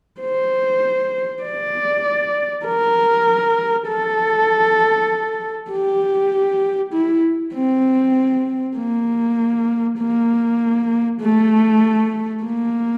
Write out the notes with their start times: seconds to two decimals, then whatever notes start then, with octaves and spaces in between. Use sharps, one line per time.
0.21 C5
1.43 D5
2.66 A#4
3.88 A4
5.71 G4
6.93 E4
7.54 C4
8.77 A#3
9.99 A#3
11.20 A3
12.44 A#3